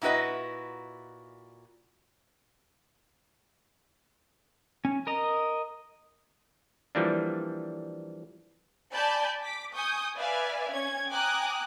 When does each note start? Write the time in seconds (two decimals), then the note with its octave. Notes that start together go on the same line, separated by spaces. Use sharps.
0.02 A#2 E4 F#4 B4 D#5
4.85 C#4
5.07 A#4 D#5 A#5
6.95 E3 F3 G3 A#3 D4
8.93 D5 G#5 A5 B5 G6
9.43 D6 B6
9.75 G#5 C#6 D#6 G6
10.17 B4 D5 E5 F5 G#5
10.72 C#4 G#6
11.09 G5 G#5 A#5 D6 D#6 F#6